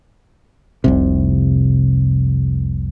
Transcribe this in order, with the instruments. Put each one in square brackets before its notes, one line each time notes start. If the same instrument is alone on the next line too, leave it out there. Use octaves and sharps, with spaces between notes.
[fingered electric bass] F1 C2 C3